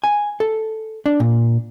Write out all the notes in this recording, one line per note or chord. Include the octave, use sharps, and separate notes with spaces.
G#5
A4
D4
A#2